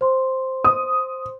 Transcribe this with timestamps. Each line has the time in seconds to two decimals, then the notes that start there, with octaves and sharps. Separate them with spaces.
0.01 C5 C6
0.64 D#6